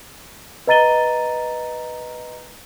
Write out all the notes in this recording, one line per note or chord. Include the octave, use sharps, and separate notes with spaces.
B4 D#5 A#5 A6 D#7 G7